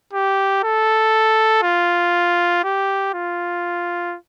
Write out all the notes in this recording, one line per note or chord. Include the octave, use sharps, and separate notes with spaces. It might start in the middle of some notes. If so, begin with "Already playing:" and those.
G4
A4
F4
G4
F4